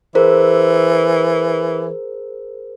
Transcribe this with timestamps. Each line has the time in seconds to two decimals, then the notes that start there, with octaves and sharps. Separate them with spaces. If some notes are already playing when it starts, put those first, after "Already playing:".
0.15 E3 G#4 A#4 C5